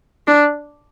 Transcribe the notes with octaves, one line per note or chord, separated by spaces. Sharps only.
D4